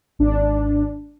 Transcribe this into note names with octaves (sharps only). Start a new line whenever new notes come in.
G#1 D4